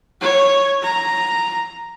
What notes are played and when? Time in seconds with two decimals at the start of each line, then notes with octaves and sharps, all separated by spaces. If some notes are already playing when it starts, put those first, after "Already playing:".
0.21 C#5
0.82 A#5